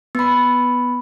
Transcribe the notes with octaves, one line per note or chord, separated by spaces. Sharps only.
B3 B5